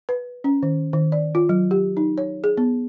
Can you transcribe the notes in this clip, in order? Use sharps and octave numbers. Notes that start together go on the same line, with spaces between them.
B4
C#4
D#3
D#3
D5
F4
F#3
G4
D#4
C#5
G#4
B3